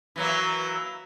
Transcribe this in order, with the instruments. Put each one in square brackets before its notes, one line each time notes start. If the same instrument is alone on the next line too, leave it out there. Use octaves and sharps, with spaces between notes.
[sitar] E3 F#3 A#3